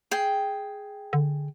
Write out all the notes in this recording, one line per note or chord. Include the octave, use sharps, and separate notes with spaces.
G#4 G5
D3